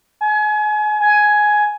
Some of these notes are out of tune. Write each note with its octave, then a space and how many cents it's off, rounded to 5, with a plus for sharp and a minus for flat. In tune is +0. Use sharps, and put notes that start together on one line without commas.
G#5 +35
G#5 +10